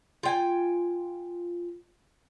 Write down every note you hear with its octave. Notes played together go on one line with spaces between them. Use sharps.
F4 G5 G#5